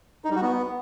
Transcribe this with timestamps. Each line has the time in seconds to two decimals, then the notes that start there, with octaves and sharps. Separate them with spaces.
0.25 D#4
0.30 G3
0.36 F#4
0.42 B3